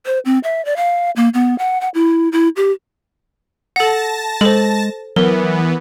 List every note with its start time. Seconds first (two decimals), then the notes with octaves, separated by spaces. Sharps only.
0.06 C5
0.25 C4
0.44 E5
0.65 D5
0.77 F5
1.16 A#3
1.34 B3
1.59 F#5
1.81 F#5
1.94 E4
2.32 E4
2.56 G4
3.76 A4 F#5 A5 A#6
4.41 G#3 A4 C5
5.16 E3 F#3 B3 A#4